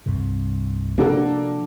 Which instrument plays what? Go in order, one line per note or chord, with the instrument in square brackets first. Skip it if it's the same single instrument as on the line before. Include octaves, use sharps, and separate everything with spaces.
[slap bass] C2 G2 C3
[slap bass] C3 F3 [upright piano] A#3 F#4 A4 [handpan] D4